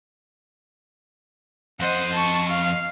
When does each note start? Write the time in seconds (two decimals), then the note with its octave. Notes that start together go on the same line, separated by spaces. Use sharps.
1.80 F2 C5 D#5 F#5
2.13 A5 C#6
2.49 F5